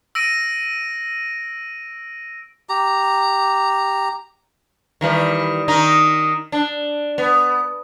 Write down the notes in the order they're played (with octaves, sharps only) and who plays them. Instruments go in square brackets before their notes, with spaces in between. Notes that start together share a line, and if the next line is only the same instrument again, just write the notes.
[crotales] E6 A#6 D7 D#7
[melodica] G4 A#5
[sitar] D#3 E3 G3
D#3 D#4
D4
B3